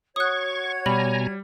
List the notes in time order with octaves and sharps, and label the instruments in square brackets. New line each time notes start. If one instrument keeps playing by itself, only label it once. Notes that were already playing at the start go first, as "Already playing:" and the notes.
[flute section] F#4 C#5 G#6 [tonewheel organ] C#6 [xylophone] D#6 F#6
[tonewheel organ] B2 G#5 A#5 [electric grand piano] G3 [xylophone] B5